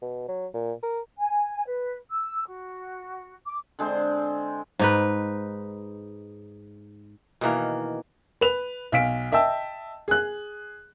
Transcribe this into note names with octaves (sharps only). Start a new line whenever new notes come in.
B2
F#3
A#2
A#4
G#5
B4
E6
F#4
D6
D3 G#3 C4 C5
G#2 D#4 B4
B2 D#3 E3 A#3
B4 F7
B1 F5 B6 D7
D#5 E5 G5 A5 E6
G#4 F#6